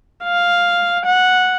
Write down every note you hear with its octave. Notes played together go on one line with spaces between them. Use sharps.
F5
F#5